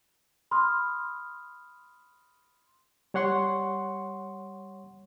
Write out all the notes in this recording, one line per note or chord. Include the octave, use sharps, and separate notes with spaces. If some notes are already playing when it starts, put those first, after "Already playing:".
B5 C6 D#6 F6
G3 C#5 F#5 C6 C#6